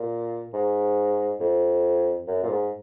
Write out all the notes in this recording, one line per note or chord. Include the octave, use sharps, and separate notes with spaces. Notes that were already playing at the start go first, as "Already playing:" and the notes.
Already playing: A#2
G#2
F2
F#2
A#2
G#2